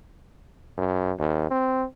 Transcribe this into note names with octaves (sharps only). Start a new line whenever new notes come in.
F#2
D#2
C4